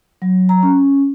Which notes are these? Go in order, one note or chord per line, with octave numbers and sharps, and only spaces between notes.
F#3
A#5
C#4